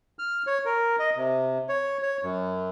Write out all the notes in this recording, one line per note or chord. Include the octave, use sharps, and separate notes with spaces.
F6
C#5
A#4
D#5
C3
C#5
C#5
F#2